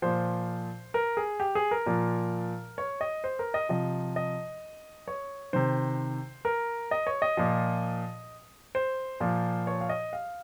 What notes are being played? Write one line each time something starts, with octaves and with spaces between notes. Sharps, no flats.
A#2 F3 C5
A#4
G#4
G4
G#4
A#4
A#2 F3
C#5
D#5
C5
A#4
D#5
C3 F3 D#5
D#5
C#5
C3 D#3 C5
A#4
D#5
C#5
D#5
A#2 F3
C5
A#2 F3
C#5
F5
D#5
F5